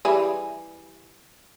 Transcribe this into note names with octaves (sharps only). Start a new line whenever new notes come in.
E3 G3 G#4